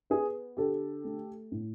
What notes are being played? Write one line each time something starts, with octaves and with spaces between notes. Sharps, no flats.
B3 G#4
D3 G4 A4
A3
A2